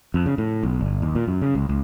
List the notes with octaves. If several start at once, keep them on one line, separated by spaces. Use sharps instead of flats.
F2
C#3
A2
B1
G1
D#2
A#2
F#2
C#3
C#2
C#2